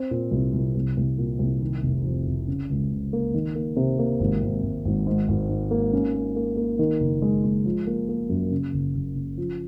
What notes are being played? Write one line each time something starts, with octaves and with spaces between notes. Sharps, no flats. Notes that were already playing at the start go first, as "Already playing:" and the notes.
Already playing: C4
A#2
C2
C2
C2
C2
A#2
C2
D#3
F1
F2
F1
C#3
C#2
C#3
A#3
D#3
A#3
C3
A#3
G#1
G#1
G#1
G#1
G#2
G#1
G#2
A#3
C#4
A#3
A#3
A#3
D#3
F#1
G#3
G#3
F3
A#3
A#3
F#2
C#3
F#1
F#1
C#3
F3